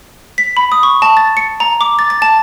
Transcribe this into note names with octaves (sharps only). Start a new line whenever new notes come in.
B6
B5
D#6
C#6
A5
A6
C#7
A#5
D6
A6
A6
A5